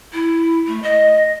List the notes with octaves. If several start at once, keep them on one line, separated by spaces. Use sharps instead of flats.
E4
A3
D#5